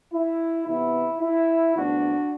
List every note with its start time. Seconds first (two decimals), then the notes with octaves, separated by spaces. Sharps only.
0.13 E4
0.67 C3 E3 B3 E4
1.22 E4
1.77 E2 D3 A3 C4 D4 F#4